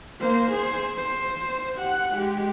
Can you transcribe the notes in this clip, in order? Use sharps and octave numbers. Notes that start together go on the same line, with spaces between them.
A#3 C5
G#4 C5
C5
G4 F#5
G#3 G4